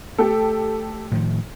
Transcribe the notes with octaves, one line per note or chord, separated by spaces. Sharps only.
A3 G4 A4
A2 D#3 F3